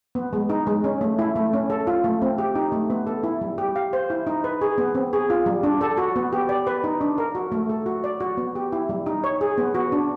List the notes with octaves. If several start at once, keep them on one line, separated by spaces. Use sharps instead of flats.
B3
G#3
D#4
G#3
C#4
A3
E4
A3
C#4
A4
F4
A3
C4
G4
D#4
A3
B3
A4
E4
G3
G4
F5
C5
E4
D#4
B4
G#4
B3
C4
G#4
F4
G3
D4
A4
F#4
B3
G4
D5
B4
D#4
D4
A#4
F#4
A3
A4
F#4
D5
F#4
B3
G4
E4
G3
D#4
C#5
G#4
B3
F#4
D4